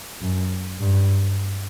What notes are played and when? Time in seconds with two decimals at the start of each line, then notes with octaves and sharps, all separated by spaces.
0.21 F#2
0.80 G2